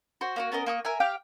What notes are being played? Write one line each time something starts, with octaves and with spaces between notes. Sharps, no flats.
F#4 C5
A#3 D#4 F#4
B3 C#4 A#4 D#5
A#3 C#6 D#6
A#4 E5 G#5
G4 F5 G5